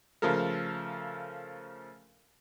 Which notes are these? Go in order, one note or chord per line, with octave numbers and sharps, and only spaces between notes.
C#3 F3 A3 A4 A#4